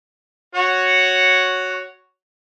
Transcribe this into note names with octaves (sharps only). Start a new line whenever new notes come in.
F#4 C#5 F#5